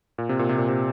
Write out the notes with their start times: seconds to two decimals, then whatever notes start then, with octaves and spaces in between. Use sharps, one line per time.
0.18 A#2
0.29 C3
0.39 A#2
0.49 C3
0.58 A#2
0.68 C3